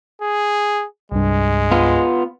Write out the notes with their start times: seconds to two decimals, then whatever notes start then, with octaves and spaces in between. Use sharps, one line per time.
0.22 G#4
1.12 C2 G2 G#3
1.71 B3 F4